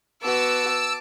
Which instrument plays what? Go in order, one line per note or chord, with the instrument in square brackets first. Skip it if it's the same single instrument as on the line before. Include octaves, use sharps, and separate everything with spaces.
[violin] B3 F#4 [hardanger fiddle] A5 D6 [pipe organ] E6